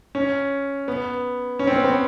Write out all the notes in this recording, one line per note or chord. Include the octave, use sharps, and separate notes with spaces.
C#4
B3
C#4
C4
B3
C4